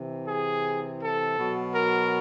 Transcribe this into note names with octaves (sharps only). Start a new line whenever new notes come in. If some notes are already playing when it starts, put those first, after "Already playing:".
Already playing: C3 E3
G#4
A4
B2 F#3
A#4